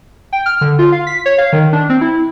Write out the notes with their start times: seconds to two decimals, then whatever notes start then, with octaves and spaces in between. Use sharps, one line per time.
0.33 G5
0.46 F6
0.61 D3
0.79 F4
0.92 F5
1.07 B6
1.26 C#5
1.38 F5
1.53 D#3
1.73 D4
1.90 C4
2.01 E4